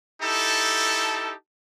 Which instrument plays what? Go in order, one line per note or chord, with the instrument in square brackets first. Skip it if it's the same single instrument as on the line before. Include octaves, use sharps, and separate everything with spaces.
[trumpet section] D#4 E4 G4 A4 A5